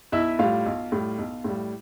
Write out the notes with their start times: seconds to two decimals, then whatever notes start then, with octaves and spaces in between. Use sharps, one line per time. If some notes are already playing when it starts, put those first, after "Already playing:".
0.12 B1 E4 E5
0.39 A2 G3 F4 F5
0.66 B1
0.92 A2 G3
1.18 B1
1.44 A2 G3